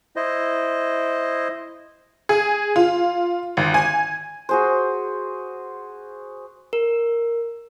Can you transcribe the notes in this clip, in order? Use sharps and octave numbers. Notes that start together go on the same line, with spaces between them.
E4 C5 D#5
G#4
F4
G#1
G#5
F#4 G#4 C5
A#4